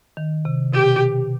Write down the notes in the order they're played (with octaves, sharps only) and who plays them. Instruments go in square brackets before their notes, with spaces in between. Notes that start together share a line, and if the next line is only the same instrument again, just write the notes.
[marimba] D#3
C3
[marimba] B2 [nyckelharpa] G4